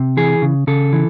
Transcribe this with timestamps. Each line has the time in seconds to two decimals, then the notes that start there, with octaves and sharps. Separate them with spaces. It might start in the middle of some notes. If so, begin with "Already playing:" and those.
Already playing: C3
0.17 E3 G#4
0.42 C#3
0.67 C#3 A4
0.93 E3